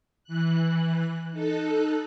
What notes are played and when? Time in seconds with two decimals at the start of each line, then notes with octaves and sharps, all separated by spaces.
0.24 E3 F#6
1.32 D#4 A4 F#6